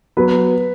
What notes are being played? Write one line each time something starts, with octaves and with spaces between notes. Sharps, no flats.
F#3 B3 B4